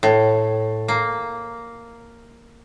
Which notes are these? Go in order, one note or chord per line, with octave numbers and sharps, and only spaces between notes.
A2
A#3